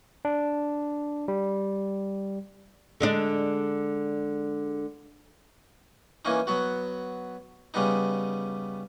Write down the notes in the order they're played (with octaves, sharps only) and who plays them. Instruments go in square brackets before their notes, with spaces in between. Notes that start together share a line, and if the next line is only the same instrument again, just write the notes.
[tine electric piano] D4
G3
[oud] D3 G#3 D4
[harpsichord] E3 A#3 C#4 D#4
F#3 B3 F#4
C#3 G3 B3 D#4